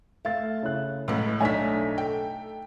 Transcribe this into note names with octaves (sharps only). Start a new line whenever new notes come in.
A3 E5 F5 A6
C#3 E4 F#6
C#2 A2 F#3 G#3 B3
B1 A3 D4 D#4 C#5 G#5 B6
A4 G5